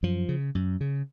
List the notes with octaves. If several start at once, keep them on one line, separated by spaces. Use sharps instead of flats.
F#2 F3
C#3
F#2
C#3